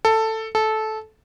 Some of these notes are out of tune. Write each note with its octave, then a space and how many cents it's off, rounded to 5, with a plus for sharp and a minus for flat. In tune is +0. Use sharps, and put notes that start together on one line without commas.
A4 +10
A4 -15